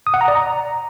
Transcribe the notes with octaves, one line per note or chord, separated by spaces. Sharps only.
D#6
F#5
A#5
D5
A#5